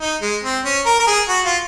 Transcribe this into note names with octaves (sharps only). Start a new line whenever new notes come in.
D#4
G#3
C4
C#4
A#4
A#4
G#4
F#4
F4